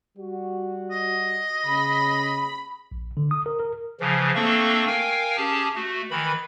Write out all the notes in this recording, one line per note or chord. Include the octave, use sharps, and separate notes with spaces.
G3 F#4
D#5
C#3 B5
A#1
D3
D#6
A#4
A#4
C#3 E3 F3
A3 A#3 C4 D4 A4 C#6
A#4 F5 G5 G#5
C#4 G4 G#4 A5
A3 F#4
D#3 E3 B5